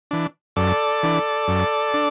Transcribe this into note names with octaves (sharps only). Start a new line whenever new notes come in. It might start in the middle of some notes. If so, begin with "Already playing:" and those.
E3 D4
F#2 A4 D5
E3 D4
F#2
D4